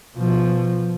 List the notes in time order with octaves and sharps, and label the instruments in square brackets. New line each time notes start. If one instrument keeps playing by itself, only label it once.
[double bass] B2 F3